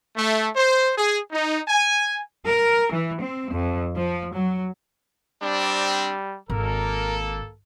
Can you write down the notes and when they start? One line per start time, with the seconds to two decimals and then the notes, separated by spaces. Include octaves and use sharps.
0.16 A3
0.55 C5
0.96 G#4
1.32 D#4
1.68 G#5
2.49 A#4
2.93 E3
3.23 C4
3.51 F2
3.97 F3
4.35 F#3
5.42 G3 C4 D4
6.50 G#1 A#3 A4 A#4